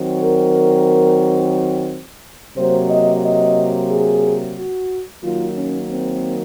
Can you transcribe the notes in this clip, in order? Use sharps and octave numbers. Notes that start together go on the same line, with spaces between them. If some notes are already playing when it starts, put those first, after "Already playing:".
Already playing: D#3 F#3 C4
A#4
C3 F#3 A#3 C5
D#5
D#5
G#4
F#4
D#3 F#3 A#3 F4
C#4
C4